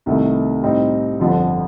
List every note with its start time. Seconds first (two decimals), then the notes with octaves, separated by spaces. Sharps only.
0.06 C2 C3 D#3 A3
0.63 A2 G3 C4 D#4
1.20 G1 F2 D3 F3 C4